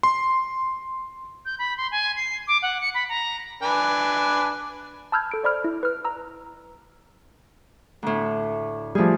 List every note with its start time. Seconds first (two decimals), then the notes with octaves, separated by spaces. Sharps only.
0.03 C6
1.45 G6
1.59 B5
1.77 C6
1.92 G#5
2.16 C7
2.47 D6
2.62 F#5
2.81 C#7
2.94 B5
3.09 A#5
3.63 D4 B4 G#5
5.12 A5 B5 E6 F6 G6 G#6
5.31 A4 D7
5.43 C5 D5 B5 F6
5.64 E4
5.83 B4 F6
6.05 A#5 E6
8.03 D2 A2
8.95 F3 G3 A3 G#4